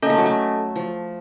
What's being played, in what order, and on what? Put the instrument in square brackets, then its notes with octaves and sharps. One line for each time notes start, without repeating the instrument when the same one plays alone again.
[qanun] A#3 [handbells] C#4 A4 D#5
[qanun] A3
F#3
A3
F3